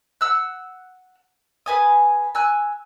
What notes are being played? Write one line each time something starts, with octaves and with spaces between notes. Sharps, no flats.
F#5 E6 F#6
G#4 B4 G#5 D#6
G#5 E6 F#6